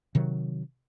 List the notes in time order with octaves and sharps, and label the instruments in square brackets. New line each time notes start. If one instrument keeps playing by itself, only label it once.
[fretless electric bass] C3 D#3 F#3